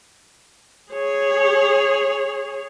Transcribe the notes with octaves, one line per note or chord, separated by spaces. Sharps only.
G#4 C#5